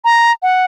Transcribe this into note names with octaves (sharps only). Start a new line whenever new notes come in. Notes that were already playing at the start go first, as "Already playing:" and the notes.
A#5
F#5